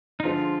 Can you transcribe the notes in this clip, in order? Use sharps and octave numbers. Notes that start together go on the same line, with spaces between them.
D#4
D3 F3 G#3 F4